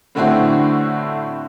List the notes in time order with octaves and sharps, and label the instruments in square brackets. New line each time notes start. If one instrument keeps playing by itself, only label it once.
[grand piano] A2 D3 C4 D4 E4 F#4